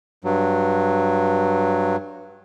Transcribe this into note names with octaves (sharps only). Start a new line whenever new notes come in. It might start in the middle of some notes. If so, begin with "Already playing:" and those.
G2 F#3